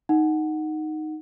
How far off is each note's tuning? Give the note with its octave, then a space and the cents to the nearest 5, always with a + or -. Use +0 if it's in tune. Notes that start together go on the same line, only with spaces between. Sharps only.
D#4 +0 F#5 +0